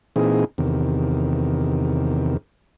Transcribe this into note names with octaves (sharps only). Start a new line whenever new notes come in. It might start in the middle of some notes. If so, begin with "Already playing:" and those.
A#2 E3 C4 D#4 G#4
E2 C3 D#3